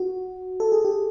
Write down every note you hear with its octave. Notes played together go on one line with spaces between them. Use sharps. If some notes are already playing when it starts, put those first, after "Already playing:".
Already playing: F#4
A4
G#4
G4